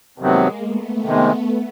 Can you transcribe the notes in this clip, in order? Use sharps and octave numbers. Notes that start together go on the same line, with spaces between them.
F2 C3 D#3 F#3 G#3 A#3 B3
A3 B3
F2 C3 D#3 G#3